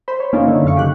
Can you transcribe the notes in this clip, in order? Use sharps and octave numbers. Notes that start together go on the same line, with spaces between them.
C5 B5
C#5
G2 A#3 C#4 D#4 F4
D3 A3 E4
F#2 D#4 F5 C#6
C#3 G4 F#6